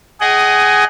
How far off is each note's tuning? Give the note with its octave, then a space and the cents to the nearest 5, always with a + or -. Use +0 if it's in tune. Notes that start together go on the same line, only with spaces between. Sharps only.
G#4 +5 D#5 +0 F#5 +35